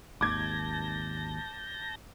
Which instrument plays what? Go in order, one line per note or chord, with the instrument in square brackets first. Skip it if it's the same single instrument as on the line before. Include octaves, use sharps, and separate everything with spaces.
[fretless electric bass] G#1 D#2 [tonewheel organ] A5 G6 A#6 [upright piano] D6 G#6